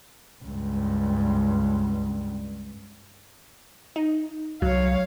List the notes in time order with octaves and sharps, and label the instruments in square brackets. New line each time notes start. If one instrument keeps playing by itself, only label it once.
[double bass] C#2 G2
[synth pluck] D#4
[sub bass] C2 [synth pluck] F#3 [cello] C#5 F5